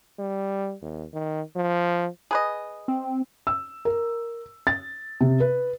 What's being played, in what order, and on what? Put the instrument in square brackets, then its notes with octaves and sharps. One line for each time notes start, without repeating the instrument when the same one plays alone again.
[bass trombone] G3
D#2
D#3
F3
[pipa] G#4 B4 D#5
[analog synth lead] C4
[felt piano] E6
A#4
A6
C3
B4